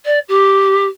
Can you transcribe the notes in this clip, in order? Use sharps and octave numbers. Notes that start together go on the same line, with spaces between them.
D5
G4